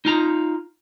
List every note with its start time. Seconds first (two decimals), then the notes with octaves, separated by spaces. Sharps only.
0.05 D#4 F4 A#5